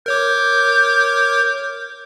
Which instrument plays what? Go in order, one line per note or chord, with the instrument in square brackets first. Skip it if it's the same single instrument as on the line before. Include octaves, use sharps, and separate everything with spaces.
[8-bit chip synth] A#4 C#5 D6 [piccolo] G6